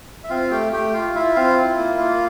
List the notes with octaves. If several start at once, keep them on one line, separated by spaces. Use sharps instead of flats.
E5
C4 F4 F5
A3 G4 G5
A3 G4 G5
F4 F5
E4 F4 E5
C4 F4 F5
E4
A#3
A#3